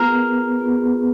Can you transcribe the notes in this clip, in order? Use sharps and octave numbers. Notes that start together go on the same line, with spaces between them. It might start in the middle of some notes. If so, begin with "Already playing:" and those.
Already playing: B3 F4 G#4 A#4 B4
B3 F4 G#4 B4